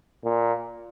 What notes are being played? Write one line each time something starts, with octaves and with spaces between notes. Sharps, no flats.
A#2